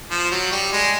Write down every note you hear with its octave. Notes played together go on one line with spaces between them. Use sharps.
F3
F#3
G3
G#3